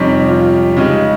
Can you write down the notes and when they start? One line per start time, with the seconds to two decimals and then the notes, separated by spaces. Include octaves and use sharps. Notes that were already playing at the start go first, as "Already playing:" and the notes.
Already playing: F2 C3 G3 C#4 D#4
0.28 F4
0.76 C#3 G#3 D#4 G4